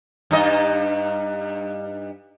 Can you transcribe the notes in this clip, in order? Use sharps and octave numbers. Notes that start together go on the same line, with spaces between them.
G2 D#4 D#5